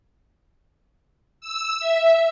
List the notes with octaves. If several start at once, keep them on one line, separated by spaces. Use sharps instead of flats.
E6
E5